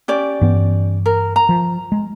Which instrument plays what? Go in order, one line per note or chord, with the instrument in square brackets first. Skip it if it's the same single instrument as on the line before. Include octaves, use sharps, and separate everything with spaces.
[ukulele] C#4 G4 D5
[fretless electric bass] G2 E3 B3
[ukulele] A#4
A#5
[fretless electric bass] F3
G#3